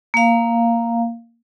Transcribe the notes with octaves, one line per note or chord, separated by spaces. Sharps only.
A#3 F5